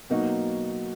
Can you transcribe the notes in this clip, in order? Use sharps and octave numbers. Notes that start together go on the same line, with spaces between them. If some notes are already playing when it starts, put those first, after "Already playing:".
B2 F#3 A#3 D#4 F#4